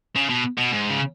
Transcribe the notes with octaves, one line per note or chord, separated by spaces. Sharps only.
C#3
B2
B2
G#2
C#3